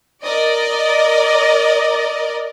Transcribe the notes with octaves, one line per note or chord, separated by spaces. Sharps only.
A#4 D5 D#5